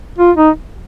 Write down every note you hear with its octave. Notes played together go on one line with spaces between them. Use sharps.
F4
D#4